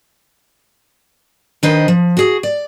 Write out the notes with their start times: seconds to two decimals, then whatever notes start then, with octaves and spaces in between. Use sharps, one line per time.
1.63 D#3 D4 B4 C5 D#5
1.88 F3
2.17 F#4 G#4
2.43 D5